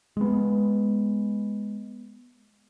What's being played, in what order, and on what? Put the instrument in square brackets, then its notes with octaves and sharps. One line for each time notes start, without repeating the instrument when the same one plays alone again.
[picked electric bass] G#3 B3